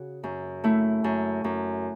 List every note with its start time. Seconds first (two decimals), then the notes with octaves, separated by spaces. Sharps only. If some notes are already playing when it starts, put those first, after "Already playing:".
Already playing: C#3 F#4
0.24 F#2
0.64 A3 E4
1.04 F#2
1.44 F#2